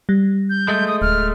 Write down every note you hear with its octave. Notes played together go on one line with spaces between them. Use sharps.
G3
G6
G#3 A3
D#6
D1 F6